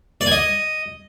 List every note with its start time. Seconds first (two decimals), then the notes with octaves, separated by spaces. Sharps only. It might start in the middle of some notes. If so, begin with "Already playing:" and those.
0.21 D5
0.26 G#5
0.32 D#5